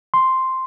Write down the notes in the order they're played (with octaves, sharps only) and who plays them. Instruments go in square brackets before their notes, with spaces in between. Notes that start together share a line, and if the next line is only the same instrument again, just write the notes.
[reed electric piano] C6